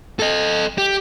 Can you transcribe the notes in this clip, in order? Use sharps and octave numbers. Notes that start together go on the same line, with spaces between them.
A4 D#5
G4